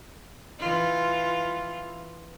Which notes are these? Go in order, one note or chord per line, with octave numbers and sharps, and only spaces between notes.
E3 F4